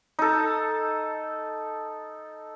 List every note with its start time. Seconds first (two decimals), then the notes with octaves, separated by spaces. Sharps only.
0.19 D#4 A4